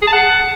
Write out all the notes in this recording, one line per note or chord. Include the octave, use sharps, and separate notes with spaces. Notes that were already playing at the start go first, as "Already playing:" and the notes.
G#4
A5
F#5